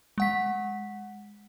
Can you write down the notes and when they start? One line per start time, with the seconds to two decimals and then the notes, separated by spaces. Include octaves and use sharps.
0.18 G#3 F#5 B6